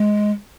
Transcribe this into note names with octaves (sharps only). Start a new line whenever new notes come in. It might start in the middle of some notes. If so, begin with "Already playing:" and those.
Already playing: G#3